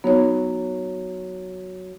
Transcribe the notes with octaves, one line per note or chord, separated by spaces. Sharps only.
F#3 B3 D#4 C#5